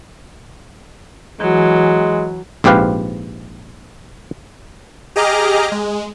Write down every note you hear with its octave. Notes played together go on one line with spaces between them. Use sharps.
E3 F#3 G#3
A#1 G#2 C4 G4 B4 F5
G4 G#4 D#5 A#5 D6 F6
G#3